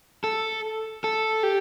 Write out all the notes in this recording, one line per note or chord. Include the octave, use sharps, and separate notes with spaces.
A4
A4
G4